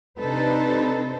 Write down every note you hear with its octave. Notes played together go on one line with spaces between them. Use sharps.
C3 D4 D#4 A4 B4 C5